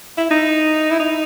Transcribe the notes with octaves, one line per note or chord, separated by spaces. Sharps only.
E4
D#4
E4
D#4